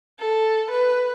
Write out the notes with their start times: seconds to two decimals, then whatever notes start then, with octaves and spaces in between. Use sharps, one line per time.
0.19 A4
0.71 B4